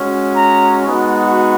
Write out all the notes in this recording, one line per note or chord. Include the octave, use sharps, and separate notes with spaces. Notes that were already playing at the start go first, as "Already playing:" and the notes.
Already playing: G#3 C#4 F#4
A#5
G#3 B3 D#4 F#4